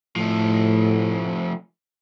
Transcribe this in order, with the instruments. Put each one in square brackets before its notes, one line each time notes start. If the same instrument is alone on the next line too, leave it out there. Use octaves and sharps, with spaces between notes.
[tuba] A2 [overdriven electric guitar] F3 A3